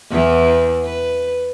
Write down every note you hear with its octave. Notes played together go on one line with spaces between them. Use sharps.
E2 E3
B4